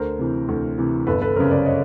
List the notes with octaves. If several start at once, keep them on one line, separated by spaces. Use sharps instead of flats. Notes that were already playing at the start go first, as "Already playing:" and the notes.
Already playing: D2 A#4 C5
C3 E3
D2
C3 E3
G1 A4 B4
A4 B4
F#2 C#3 A#4 C5
C5 D5
C#5 D#5